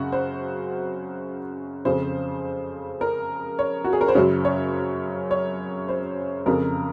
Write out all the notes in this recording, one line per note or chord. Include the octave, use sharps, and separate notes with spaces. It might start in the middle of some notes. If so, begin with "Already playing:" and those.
Already playing: F#2 C#3 F#4
C5
F2 C#3 C5
A#4
C#5
F#4
G#4
A#4
C5
F#2 C#3 C#5
C#5
C#5
C5
F2 C#3 A#4